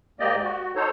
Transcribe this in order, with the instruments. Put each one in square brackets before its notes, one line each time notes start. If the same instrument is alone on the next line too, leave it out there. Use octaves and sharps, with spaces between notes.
[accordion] G#2 A#3 G4 D5 D#5
F#4
D#4 A4 C5 C#5